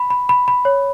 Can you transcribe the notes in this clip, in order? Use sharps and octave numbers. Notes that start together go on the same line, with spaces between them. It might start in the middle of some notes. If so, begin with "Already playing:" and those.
Already playing: B5
B5
B5
B5
C#5